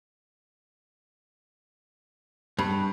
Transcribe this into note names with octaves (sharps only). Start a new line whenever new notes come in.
G2